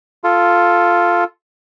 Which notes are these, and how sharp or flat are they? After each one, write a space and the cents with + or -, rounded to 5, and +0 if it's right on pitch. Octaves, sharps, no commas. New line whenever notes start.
F4 +0 A4 +0